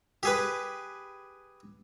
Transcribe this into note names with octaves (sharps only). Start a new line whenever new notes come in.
G4 G#4 B4